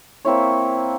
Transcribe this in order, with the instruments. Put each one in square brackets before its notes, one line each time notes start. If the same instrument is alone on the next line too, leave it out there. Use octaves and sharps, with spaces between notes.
[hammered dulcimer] A#3 C4 E4 C#5